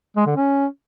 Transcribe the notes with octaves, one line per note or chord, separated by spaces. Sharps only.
G#3
D3
C#4